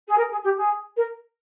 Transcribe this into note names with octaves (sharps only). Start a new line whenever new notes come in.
G#4
A#4
G#4
G4
G#4
A#4